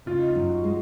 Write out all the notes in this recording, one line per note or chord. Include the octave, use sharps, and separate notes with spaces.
C#3 F4
D#4
F4
F#2
F#4
G#3